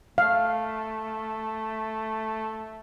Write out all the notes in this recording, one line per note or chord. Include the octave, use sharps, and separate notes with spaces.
A3 F5